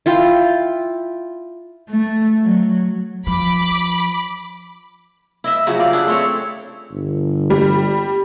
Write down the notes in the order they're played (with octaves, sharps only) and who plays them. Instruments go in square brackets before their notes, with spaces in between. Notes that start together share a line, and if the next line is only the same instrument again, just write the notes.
[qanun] E4 F4 G5
[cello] A3
F#3
[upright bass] F3 [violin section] B5 D6
[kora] E4 D#5 E5
C#3 F3 F#3 E4
G4 D5 F5
D4 E4 G#4
A3 C4 E4 C#5
[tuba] G1
[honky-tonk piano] G3